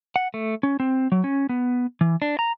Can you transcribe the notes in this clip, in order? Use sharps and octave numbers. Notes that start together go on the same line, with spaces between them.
F#5
A3
C#4
C4
F#3
C#4
B3
E3
D4
A#5